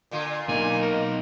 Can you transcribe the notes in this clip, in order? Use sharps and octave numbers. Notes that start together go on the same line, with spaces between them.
A#2 D3 F4
B1 A#3 D#4 G#5
A#4